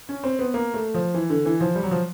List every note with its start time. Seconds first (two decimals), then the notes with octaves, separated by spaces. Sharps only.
0.09 C#4
0.24 C4
0.39 B3
0.54 A#3
0.74 A3
0.94 F3
1.14 E3
1.30 D3
1.45 E3
1.60 F3
1.75 G3
1.83 F#3
1.91 F3